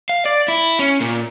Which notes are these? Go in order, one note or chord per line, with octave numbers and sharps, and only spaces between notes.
F5
D5
E4
C#4
A#2